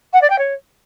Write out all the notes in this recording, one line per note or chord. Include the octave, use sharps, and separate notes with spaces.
F#5
D5
G5
C#5